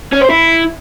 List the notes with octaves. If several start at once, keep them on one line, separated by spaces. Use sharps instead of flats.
C#4
C5
E4